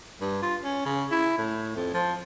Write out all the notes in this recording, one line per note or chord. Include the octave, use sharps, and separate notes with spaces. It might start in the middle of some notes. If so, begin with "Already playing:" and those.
G2
F4
C#4
C#3
E4
A2
F2
F3